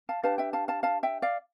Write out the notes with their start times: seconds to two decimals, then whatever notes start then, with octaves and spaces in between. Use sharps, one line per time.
0.09 F5 A5
0.23 D4 G4 B4 F5 A5
0.38 E5 G5
0.53 F5 A5
0.68 F5 A5
0.83 F5 A5
1.03 E5 G5
1.22 D5 F5